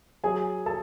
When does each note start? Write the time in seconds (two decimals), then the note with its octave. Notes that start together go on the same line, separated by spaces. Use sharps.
0.24 F#3 G#4 G#5
0.66 A4 A5